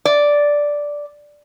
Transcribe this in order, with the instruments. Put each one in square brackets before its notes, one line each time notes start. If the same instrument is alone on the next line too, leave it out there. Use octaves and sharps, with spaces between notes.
[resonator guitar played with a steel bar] D5